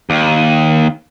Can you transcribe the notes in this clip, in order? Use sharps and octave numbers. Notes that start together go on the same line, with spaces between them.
D#2